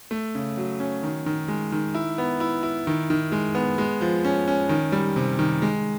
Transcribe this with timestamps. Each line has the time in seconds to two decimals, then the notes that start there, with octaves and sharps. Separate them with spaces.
0.11 A3
0.35 C#3
0.57 F#3
0.80 C#4
1.03 D#3
1.26 D#3
1.48 G#3
1.72 D#3
1.95 E4
2.18 B3
2.40 E4
2.63 E4
2.87 D#3
3.10 D#3
3.32 G#3
3.55 B3
3.78 G#3
4.01 F3
4.25 C#4
4.48 C#4
4.69 D#3
4.92 G3
5.16 C3
5.39 D#3
5.62 G#3